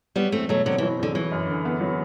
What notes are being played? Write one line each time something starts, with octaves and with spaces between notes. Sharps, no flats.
F#3 G3 B3
E2 A3 C4
B2 F#3 A3
D3 F#3 C4
E3
F#3
E2 D3
E3 F#3
F#2
D3
B3
F#3